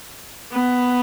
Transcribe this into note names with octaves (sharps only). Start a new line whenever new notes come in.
B3